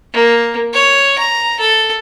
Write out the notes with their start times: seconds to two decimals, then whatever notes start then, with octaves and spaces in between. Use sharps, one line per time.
0.13 A#3
0.73 C#5
1.18 A#5
1.60 A4